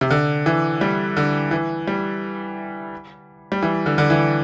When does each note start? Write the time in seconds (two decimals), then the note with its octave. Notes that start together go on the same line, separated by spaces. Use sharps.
0.01 C3
0.11 D3
0.46 E3
0.81 G3
1.17 D3
1.51 E3
1.88 G3
3.52 G3
3.62 E3
3.86 D3
3.98 D3
4.10 E3